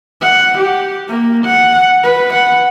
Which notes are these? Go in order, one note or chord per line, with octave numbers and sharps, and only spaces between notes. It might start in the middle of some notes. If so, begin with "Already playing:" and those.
F#5
G4
A#3
F#5
B4
F#5